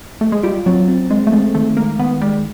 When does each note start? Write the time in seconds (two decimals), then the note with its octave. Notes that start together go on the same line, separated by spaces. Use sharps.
0.21 A3
0.32 G#3
0.44 G3 F4
0.66 F#3 C4
0.88 C4
1.10 G#3 C4
1.27 A3
1.32 G#3 C4
1.55 D#3 A3
1.77 G#3 A#3
1.99 D#3 B3
2.21 G3 G#3